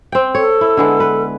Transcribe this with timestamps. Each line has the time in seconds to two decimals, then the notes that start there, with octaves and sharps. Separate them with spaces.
0.12 C4 G5
0.35 A4 C#5
0.61 E4
0.77 D3 G#3 B3
1.00 B4